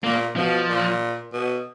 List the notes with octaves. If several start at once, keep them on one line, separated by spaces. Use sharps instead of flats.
A#2 A#3
B2 F3
A#2
B2